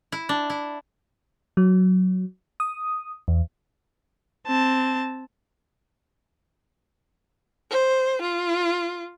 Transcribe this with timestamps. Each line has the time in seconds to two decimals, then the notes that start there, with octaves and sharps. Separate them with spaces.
0.12 E4
0.29 D4
0.50 E4
1.57 F#3
2.60 D#6
3.28 E2
4.47 C4 A5
7.71 C5
8.22 F4